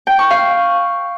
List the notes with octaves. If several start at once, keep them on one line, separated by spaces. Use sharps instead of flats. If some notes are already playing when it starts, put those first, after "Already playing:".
G5
C#6
F5